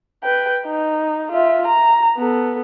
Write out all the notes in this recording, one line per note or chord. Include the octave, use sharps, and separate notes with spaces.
B4 G5
D#4
F4 E5
A#5
B3 A4